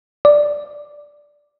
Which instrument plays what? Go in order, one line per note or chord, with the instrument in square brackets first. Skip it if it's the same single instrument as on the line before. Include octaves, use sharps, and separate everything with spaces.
[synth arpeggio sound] D5